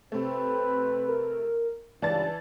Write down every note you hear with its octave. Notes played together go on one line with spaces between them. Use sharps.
C3 A3 C4 B4
A#4
C#2 G2 E3 D5 A5 A6